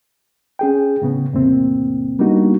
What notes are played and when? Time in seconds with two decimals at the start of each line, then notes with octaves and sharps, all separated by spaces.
0.59 C#4 G#4 G5
1.02 A2 C#3 B3
1.33 E2 A2 C3 A#3 C4
2.19 G3 A#3 B3 D4 D#4 F#4